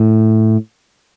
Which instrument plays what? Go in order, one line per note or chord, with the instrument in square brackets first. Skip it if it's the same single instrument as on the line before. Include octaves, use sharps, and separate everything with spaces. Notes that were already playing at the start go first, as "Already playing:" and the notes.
Already playing: [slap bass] A2